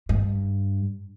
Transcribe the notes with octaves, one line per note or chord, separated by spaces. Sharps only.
G2